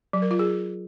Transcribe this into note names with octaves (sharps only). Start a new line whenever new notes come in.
F#3
A#4
F4
G#4